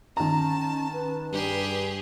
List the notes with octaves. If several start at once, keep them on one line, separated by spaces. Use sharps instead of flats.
D#3 C#4 A5 A#5
B4
G2 G4 G#4